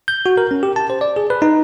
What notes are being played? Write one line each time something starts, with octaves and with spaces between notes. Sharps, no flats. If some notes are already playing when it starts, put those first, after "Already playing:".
G6
F#4
A#4
C#4
G4
A5
C5
D5
G#4
B4
D#4